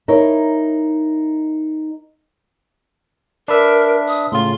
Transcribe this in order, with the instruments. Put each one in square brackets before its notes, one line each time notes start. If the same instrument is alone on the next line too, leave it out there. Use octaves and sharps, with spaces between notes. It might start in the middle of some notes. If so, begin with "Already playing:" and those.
[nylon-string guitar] D#4 E4 A#4 C#5
[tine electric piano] D4 B4 E5 [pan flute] A#4
[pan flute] D#6
[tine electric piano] A2 C#3 F4 [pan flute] C6